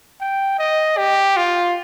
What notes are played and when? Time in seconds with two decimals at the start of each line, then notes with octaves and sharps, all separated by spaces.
0.20 G5
0.58 D#5
0.97 G4
1.36 F4